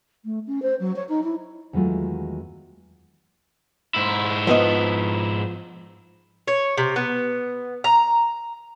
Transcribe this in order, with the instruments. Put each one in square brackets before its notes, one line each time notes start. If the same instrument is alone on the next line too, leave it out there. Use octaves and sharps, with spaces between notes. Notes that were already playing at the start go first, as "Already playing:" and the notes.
[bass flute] A3
C#4
C5
F#3
C#5
D#4
E4
[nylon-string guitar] E2 D#3 F#3 G#3 A3 F4
[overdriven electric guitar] G#2 E4
[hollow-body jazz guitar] F3 B3 D#5
[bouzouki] C#5
C3
B3
A#5